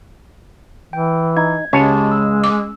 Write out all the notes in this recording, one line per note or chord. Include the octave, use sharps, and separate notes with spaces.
E3 G5
D#4 G#6
C#2 G#3 C#4 G4 C#5 G#5 A5
E6
D6